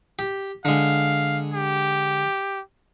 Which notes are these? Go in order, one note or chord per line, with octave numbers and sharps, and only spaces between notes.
G4
D3 G#3 F5
G4